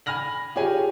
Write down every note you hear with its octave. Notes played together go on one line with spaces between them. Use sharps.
G#5 B5 F6 A#6 F#7
F4 G4 G#4 C#5 G#5